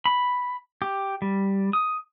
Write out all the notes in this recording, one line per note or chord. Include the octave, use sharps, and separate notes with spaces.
B5
G4
G3
D#6